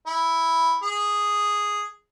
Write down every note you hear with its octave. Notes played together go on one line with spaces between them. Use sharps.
E4
G#4